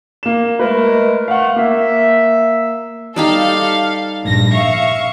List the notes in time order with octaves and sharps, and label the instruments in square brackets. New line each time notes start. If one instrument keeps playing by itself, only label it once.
[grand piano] A#3 E7
[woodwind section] G#3 A3 A#4 [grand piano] B4
[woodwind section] A3 [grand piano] F5 F#5
[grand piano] A#3 [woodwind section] E5
[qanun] G3 D#4 G4 [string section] A4 F5
[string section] A#1 G2 A#6
E5 F5 C#6